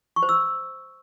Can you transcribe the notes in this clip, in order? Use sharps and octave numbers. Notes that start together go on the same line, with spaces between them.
C#6
C5
E6